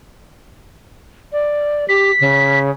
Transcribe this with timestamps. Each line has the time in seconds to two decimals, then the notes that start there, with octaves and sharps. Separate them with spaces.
1.32 D5
1.88 G4 B6
2.20 C#3